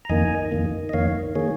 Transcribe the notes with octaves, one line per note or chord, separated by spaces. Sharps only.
A#5
F2 D#3 A#3 D#5 G#5
F2 D#3 A#3
D#5
F2 D#3 A#3 C#5 F5
D#3 A#3 G#4 C#5